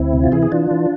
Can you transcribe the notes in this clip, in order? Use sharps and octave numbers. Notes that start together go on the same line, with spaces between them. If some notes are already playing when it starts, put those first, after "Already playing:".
Already playing: D2 C4 E4
C3
F4
E3 E4 G#4
G#4
E3 D4 F4
E3